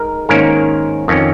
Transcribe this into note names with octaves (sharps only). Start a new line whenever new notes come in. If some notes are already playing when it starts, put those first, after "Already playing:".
Already playing: G#3 D#4 A#4
G#2 D#3 A#3 C#4 A#4
F2 D#3 C#4